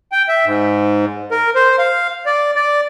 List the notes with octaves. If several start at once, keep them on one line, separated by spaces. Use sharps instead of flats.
G5
E5
G#2
A#4
C5
F5
D5
D5